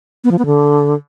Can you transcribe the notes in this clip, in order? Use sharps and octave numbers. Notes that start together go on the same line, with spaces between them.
B3
F3
B3
D3